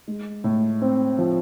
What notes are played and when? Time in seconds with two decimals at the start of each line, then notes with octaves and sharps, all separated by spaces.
0.08 G#3
0.44 A2
0.82 C4
1.19 F3